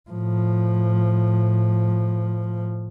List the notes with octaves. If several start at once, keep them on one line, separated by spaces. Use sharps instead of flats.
A2 F3